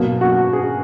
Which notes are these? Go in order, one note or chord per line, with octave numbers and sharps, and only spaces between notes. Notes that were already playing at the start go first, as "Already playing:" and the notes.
Already playing: B2 F#3 A#3
F#4
G#4